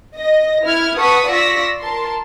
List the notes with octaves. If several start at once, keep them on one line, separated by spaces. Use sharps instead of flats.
D#5 A#6
E4 F6 G#6
B4 F#5 A5 C#6 D#6 B6
F4 D5 C#6 E6 A#6 B6
A#4 A5 C6